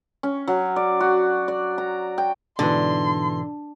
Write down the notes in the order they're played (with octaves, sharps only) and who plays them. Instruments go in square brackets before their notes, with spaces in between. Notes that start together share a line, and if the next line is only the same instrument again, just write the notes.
[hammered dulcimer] C#4
F#3
D5
F#4
D5
A#5
G5
[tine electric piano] G#2 B2 E3 [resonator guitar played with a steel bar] D3 [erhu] C6